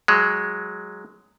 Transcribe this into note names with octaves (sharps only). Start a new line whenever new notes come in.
F#3 G#3